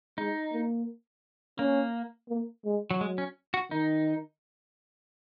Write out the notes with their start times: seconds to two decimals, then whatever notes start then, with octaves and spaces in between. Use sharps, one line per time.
0.17 G#3 D#4
0.53 A#3
1.59 A#3 C#4
2.29 A#3
2.65 G#3
2.91 F#3
3.01 F#3 G#3
3.18 C#4
3.54 F#4
3.71 D#3 D#4